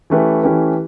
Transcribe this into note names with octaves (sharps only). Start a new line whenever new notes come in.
E3 A3 C#4 G4 B4
E3 A3 C#4 G4 B4